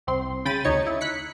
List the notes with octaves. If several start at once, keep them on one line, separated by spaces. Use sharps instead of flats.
C2 C4 C6
C#3 G5 B5 A6 D#7
D2 D#4 C#5 C#7
E4
F#6 B6 C#7